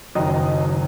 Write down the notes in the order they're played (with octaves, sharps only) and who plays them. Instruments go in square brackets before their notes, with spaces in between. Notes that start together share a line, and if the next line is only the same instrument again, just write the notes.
[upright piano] F#1 F#2 D#3 F#3 D#5